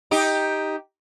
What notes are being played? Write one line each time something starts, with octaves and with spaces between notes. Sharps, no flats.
D#4 G4